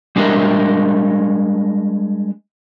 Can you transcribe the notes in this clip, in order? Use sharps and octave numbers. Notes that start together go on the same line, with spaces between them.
G3 G#3 D4 A#4 D#5 E5